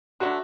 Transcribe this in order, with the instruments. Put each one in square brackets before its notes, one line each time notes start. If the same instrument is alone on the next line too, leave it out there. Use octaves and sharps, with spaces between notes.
[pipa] D3 F#3 A3 D4 [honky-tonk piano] F#4